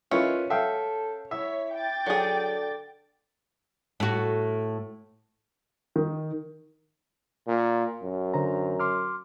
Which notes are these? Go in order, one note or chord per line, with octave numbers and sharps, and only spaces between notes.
D#3 C#4 E4 F4 B4
A4 E5 F5 G5
E4 C#5 E5 B6
G5 D6 A6
D3 F#3 G#4
A2 F#4
D#3
A#2
F#2
D3 C5 A#5
C6 D6 F6